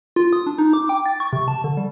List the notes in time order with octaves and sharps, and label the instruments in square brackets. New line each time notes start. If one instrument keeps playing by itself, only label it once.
[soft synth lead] F4
D#6
D4
D#4
D6
G5
A6
C#6
C3
A5
D3
G3